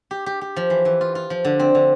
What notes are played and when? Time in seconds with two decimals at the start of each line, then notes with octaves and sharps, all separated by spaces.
0.11 G4
0.26 G4
0.41 G4
0.56 F3
0.70 E3
0.85 E3
1.01 F4
1.15 F4
1.30 F3
1.45 D3
1.59 C4
1.75 D3